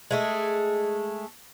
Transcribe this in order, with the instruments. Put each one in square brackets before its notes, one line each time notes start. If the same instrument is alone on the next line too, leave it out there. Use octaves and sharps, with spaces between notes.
[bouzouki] G#3 A3 G#4